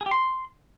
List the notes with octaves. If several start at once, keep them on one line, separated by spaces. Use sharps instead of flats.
G#4
G4
C6